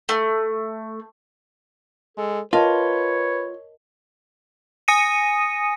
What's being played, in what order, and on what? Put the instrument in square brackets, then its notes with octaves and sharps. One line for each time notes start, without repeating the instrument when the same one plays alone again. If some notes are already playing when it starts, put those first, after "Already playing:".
[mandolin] A3
[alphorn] G#3 [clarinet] A4
[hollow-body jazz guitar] F4 [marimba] A#4 D#5 A5 [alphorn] B4 [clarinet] C#5
[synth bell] G#5 D#6 A#6 C#7 D#7